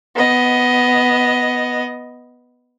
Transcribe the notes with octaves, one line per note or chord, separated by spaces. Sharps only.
B3 D#5